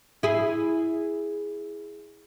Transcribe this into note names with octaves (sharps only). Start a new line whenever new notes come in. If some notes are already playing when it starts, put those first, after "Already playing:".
E4 G#4